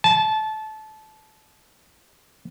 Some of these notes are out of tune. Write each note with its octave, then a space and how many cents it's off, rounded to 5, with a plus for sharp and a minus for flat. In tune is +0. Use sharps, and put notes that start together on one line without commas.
A5 -20